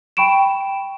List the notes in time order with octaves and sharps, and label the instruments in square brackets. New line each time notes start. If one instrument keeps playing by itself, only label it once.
[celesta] G5 B5 C#6 D7 E7